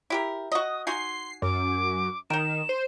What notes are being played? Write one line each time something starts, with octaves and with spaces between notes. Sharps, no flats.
E4 G4 A#4
F#4 D#5 D#6
D#4 F#4 G#5 C6 C7
F#2 D6
D#3 D#4 A#4 E7
C5